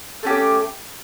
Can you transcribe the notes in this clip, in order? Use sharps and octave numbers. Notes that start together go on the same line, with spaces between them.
A3 C#4 G4